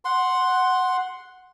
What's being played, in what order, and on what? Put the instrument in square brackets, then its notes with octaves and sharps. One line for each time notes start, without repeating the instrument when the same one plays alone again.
[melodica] F#5 C6